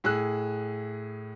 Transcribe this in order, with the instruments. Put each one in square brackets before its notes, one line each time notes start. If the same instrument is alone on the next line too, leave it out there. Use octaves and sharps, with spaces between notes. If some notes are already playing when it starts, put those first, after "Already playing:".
[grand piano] A2 G#4 E6 F#6